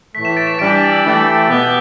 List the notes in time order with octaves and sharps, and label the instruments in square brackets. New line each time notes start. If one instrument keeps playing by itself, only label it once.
[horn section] A2 E3 A3 [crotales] B6
[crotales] B6 E7
A6 D7
B6 E7
[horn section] E3 G3 D4 G4 [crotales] A6 D7
[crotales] B6
A6
E6
[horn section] E3 A3 G4
B2 B3 G4